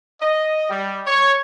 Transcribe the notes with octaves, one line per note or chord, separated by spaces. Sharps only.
D#5
G3
C#5